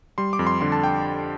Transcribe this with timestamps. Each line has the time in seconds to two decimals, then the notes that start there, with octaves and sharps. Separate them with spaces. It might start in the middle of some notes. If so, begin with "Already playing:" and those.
0.18 G3 C6
0.33 D6
0.39 F2
0.47 C6
0.61 D3 C6
0.72 A5
0.84 G5